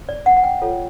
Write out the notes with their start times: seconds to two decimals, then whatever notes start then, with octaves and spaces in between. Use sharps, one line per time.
0.09 D5
0.26 F#5
0.37 F#5
0.44 G5
0.61 F4 A4 C#5